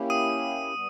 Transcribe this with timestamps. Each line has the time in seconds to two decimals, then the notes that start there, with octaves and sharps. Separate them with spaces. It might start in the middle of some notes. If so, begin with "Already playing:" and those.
Already playing: A#3 C#4 E4 G4
0.10 D#6 D#7
0.74 G3 B3